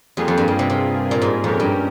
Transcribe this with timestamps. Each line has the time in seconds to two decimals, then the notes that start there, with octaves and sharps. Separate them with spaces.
0.17 F2 G3 A#3 F4 G#4
0.28 F2
0.38 G2
0.48 G2
0.59 C3
0.70 C3
1.11 A#2
1.22 G#2
1.43 F2 A#2 G#3 C#4 G4 A#4
1.60 G2